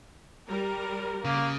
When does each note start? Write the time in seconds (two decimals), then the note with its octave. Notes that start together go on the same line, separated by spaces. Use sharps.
0.47 G3 A#4
1.25 C#3 A#3